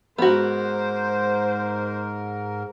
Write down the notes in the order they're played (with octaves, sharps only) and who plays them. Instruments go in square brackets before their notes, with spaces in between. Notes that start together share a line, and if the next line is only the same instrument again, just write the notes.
[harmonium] G#2 A#4 [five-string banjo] B3 F#4 [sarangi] C5